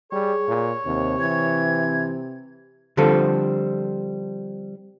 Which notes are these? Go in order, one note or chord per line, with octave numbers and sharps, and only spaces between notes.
G3 G#4 C#5
A#2
D#2 C3 C4
E3 G#6
D3 F3 G3 C4 A4